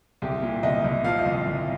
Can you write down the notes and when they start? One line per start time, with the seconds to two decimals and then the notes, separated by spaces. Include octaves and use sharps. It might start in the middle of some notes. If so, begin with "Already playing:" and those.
0.22 C2 G4
0.42 A#2
0.63 C2 D#5
0.84 C2
1.04 F3 F5
1.19 D#5
1.25 C2
1.32 F5
1.47 C2